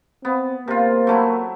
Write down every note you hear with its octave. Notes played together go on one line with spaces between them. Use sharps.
B3 C4
C3 A#3 F4
F#3 A3 E4